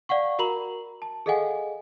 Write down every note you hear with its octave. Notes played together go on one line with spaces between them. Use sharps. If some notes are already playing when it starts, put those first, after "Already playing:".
D5 F5 F#5 C#6
F#4 A#4 A#5 B5 F#7
A5
G#4 A4 D#5 F5 F#5 G#5